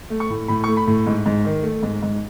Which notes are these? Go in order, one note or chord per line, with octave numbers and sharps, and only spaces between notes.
A3
C#6
A2
A2 B5
C#6
A3
B5
A2
G#2
G#2
D#3
A3
G#2
G#2